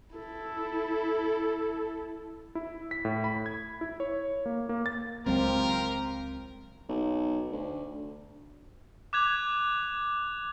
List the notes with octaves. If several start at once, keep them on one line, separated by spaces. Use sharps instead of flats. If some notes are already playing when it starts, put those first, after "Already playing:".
E4 A4
E4
B6
A2
B5
G#6
E4
C#5
A#3
A#3
A6
C#2 F#3 C4 F4 G4 A#4
B1
D2
D6 F#6 G#6 F7